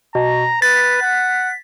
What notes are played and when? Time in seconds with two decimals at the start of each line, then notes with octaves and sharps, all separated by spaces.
0.15 B2 A#5
0.62 B4 A6 B6
1.02 F#5